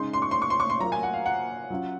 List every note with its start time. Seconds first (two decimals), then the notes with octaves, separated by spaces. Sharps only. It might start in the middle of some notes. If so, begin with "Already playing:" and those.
Already playing: C#3 G#3 D#4 C6
0.13 C6
0.22 C#6
0.31 C6
0.42 C#6
0.50 C6
0.60 C#6
0.70 C6
0.80 F#3 A#3 F4 A#5
0.92 G#5
1.03 F#5
1.14 F5
1.26 F#5
1.70 F#3 C#4 F4